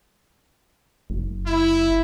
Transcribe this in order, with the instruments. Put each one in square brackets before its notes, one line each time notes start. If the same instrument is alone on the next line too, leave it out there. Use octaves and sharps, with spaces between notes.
[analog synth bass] F#1
[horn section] E4